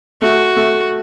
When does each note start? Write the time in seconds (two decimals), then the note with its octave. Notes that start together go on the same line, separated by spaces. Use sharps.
0.22 A3 F#4
0.56 A3